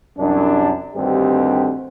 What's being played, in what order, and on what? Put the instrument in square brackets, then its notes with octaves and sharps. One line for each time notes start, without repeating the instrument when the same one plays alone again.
[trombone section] C2 F#2 D4
D2 G2 D3 D#3 C4 G4